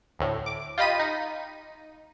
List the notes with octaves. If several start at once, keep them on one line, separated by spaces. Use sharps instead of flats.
D2 A2
D6
F4 G4 D#5 B5 B6 D#7
D#4